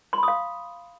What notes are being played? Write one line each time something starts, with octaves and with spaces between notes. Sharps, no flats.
F5 B5 C6 D#6